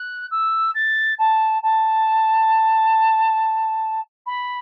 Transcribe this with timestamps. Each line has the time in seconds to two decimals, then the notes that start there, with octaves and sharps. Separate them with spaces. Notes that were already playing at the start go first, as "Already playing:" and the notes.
Already playing: F#6
0.31 E6
0.74 A6
1.19 A5
1.63 A5
4.26 B5